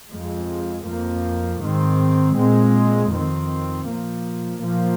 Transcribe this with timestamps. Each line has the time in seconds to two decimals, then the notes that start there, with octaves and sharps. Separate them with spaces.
0.10 F2 F3 G#3
0.85 F2 F3 A#3
1.61 G#2 D#3 C4
2.36 A#2 G#3 C4
3.11 F2 D#3 C4
3.87 A#2 F3 A#3
4.62 A#2 F3 A#3